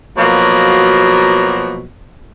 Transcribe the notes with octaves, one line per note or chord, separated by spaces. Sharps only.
B2 F3 F#3 A#3